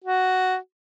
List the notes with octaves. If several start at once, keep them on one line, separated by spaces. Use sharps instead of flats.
F#4